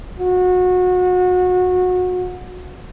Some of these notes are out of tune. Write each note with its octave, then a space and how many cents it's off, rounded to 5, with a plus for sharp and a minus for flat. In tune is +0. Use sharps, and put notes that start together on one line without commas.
F#4 -25